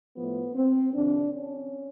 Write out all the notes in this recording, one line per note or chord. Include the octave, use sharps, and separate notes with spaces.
A2 F3 A3 B3
C4
F2 C3 D#3 D4
C#4